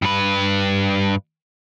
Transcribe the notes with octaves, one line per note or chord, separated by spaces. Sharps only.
G2 B4